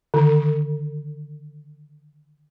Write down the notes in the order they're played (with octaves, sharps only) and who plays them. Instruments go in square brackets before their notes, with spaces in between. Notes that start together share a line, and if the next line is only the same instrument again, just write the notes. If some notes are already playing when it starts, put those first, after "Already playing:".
[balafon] D3 D#3